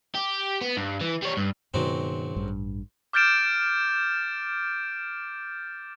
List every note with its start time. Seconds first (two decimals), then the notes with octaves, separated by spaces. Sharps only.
0.15 G4
0.61 B3
0.77 G2
1.01 E3
1.22 G3 C#5
1.37 G2
1.74 C#2 G2 B2 D#3 F#3 C4
2.36 A1 G2
3.13 D6 F6 G6 A6 D7 E7